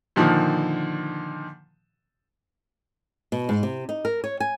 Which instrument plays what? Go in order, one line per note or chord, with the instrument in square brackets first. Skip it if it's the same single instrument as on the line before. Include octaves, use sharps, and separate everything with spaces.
[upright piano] A#2 D3 D#3 F3
[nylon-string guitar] B2
G#2
C3
D#4
A#4
C#5
G#5